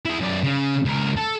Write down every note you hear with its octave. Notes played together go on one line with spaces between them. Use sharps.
E4 G#4
F#2 D5
C#3
C#2 A#4
A4